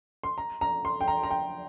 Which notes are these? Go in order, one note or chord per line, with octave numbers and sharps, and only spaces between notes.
C6
A#5
A#5
C6
G5
A#5
A#5
G5